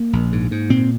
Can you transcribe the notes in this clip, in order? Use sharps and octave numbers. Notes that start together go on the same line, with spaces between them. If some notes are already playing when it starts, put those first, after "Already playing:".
Already playing: A#3
A#1
G#2
G#2
A#2 C4